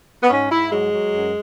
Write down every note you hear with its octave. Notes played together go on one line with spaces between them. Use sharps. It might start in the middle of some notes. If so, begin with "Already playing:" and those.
B3
G#2 C#4
G#2 E4
F#3 G#3
F#3
F#2